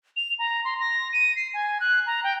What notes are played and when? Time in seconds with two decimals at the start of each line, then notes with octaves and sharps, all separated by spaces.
0.16 F7
0.39 A#5
0.65 C6
0.80 A#6
1.13 D#7
1.36 C7
1.54 G#5
1.80 F#6
2.07 A#5
2.24 G5